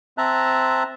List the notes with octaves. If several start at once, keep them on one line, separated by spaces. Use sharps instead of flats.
C4 E5 A5 A#5 F#6